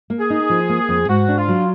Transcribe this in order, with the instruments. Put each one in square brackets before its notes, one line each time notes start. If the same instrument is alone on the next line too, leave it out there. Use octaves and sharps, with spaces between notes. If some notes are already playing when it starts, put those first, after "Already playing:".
[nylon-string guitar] A#3
[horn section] G#4
[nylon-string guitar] D#4
F3
A#3
F2
[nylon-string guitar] G#2 [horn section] F#4
[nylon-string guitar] D4
[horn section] F4
[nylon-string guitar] F#3